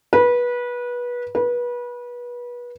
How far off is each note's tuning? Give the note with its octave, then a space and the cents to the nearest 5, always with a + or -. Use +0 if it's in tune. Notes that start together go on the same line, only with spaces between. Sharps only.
B4 -25
B4 -30